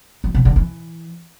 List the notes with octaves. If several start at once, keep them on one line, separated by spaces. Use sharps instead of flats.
F#3
B2
D3
E3